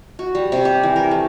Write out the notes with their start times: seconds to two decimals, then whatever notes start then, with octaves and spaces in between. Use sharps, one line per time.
0.19 F#4
0.35 G3
0.52 C3
0.65 G4
0.83 E3
0.96 A#4
1.11 A3